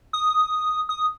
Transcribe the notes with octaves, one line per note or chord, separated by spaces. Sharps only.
D#6
D#6